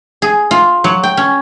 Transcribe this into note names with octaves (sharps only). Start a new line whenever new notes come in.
G#4
F4
F#3
G5
C#4